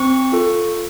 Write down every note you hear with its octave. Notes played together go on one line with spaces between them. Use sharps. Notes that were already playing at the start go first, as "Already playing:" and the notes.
Already playing: C4 C#6
F4 A4